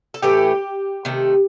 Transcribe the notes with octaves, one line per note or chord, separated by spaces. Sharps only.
A4
A2 E3 A3 G4
C3 D#3 A3